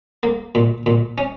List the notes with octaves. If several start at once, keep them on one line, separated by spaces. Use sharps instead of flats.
A#3
A#2
A#2
C#4